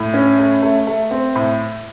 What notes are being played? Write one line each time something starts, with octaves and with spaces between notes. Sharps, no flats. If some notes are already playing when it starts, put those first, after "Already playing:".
Already playing: A2 A3
C#4
A3
A3
A3
C4
A2